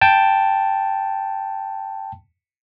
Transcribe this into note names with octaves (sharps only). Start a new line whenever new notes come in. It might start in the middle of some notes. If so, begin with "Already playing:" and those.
G5 A5